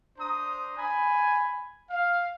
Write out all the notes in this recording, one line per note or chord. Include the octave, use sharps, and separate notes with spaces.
D4 C5 A#5 D#6
G#5 B5
F5